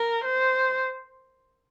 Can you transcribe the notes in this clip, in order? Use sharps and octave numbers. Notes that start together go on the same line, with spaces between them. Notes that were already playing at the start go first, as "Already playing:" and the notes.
Already playing: A#4
C5